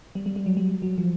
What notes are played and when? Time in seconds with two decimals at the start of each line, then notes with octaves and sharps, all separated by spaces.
0.15 G3
0.26 G3
0.36 G3
0.46 F#3
0.57 G3
0.82 F#3
0.98 F3